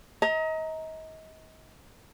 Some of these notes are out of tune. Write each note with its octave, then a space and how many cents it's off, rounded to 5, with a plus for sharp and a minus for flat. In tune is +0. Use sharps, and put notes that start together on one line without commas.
D#5 +35 A#5 -5